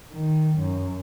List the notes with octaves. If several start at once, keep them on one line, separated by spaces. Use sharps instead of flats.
D#3
F#2